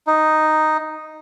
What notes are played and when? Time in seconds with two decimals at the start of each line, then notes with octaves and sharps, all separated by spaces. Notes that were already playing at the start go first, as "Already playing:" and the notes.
0.07 D#4